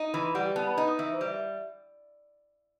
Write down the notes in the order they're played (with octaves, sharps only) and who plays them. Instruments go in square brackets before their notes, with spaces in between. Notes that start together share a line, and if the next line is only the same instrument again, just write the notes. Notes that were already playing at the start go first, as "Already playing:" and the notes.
Already playing: [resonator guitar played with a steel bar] D#4
[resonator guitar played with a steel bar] E3 [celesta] B5
[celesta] C6
[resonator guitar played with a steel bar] G3 [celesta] F#5
[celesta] G5
[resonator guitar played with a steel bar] B3 [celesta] A5
[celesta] B5
[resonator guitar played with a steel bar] D#4
[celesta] D#6
[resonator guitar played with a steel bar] E3 [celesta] E5
[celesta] C5
[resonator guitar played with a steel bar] G3
[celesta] E5